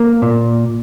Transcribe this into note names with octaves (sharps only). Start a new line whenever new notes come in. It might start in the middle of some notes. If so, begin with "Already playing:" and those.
Already playing: A#3
A#2